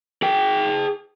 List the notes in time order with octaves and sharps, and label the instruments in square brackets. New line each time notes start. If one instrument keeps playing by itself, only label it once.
[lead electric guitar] G#4 G5